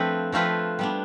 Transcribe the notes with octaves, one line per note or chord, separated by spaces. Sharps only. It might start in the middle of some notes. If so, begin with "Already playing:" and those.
Already playing: F3 A3 C4 D4 F4 B4
F3 A3 C4 F4 B4
G3 B3 D4